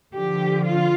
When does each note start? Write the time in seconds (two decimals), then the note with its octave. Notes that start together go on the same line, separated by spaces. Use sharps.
0.14 D3 F3 G4
0.65 F4